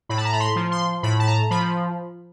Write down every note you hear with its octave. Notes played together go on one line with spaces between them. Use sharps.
A2 B5
A5
A#5
B5
C6
F3
C6
A2 B5
A5
A#5
F3 B5